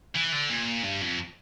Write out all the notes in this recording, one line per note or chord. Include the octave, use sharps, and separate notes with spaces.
E3
D3
A#2
G2
F2